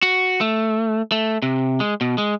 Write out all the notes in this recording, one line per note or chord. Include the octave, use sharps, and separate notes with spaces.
F#4
A3
A3
C3
G#3
B2
G#3